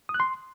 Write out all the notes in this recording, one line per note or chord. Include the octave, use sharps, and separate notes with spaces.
D#6
F#6
C6